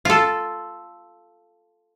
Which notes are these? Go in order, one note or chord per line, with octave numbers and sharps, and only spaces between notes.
F4 A4